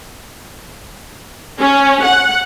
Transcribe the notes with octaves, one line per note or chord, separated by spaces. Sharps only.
C#4
F#5